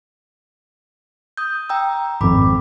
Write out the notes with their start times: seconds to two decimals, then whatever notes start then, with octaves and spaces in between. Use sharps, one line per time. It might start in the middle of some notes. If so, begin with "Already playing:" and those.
1.37 D#6 G6
1.69 G5 A#5 E6
2.21 G#1 F2 B5 D6